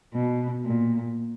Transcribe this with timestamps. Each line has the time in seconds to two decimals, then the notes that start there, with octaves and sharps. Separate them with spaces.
0.14 B2
0.64 A#2